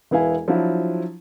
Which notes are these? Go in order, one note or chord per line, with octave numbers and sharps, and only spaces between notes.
E1 B3 E4 F5 G#5
F3 F#3 D4 E4 F4